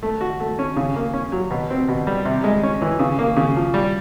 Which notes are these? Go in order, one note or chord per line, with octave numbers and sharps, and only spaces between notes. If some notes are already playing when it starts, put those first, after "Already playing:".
A3
F#4
A3
C#4
C#3
A#3
C#4
F#3
B2
C4
B2
G3
C3
G#3
C#4
E3
C#3
A#3
C#3
F3
G3